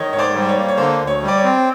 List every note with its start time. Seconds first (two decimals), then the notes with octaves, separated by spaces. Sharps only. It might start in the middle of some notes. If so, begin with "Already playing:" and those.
Already playing: D#3 C#5 D#5
0.12 G#2 C#5
0.18 C5 D5
0.34 G3
0.42 C5
0.49 C#5
0.56 A#3
0.68 C#5
0.78 D3 C5
1.01 D2
1.07 C#5
1.23 G3
1.28 D5
1.37 C#5
1.44 C4